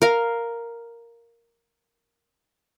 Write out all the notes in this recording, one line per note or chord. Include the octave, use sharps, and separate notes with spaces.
A#4 F5